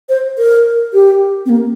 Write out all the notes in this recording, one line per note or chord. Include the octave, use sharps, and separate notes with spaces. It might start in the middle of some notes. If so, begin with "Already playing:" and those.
C5
A#4
G4
C4
A#3